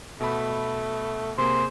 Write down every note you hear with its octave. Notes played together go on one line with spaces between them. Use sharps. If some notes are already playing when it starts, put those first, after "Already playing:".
B2 A3 B5
C3 A#3 G#4 C5